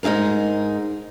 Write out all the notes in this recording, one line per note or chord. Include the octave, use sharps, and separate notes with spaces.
G#2 D#4 E4 G#4 A#4